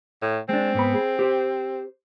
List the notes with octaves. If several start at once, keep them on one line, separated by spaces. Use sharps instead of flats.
A2
G#3 C4 D4
G#2 B3 B5
G#4
G4 C5